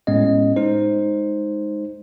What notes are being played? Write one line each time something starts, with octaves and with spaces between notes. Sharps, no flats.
A2 G#3 B3 C#4 D#5
G#3 D#4 C5